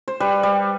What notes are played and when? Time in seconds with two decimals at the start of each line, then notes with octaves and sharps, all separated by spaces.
0.08 C5
0.20 G3 B4
0.43 G3